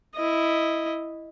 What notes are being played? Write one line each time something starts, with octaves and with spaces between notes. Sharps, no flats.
E4 D#5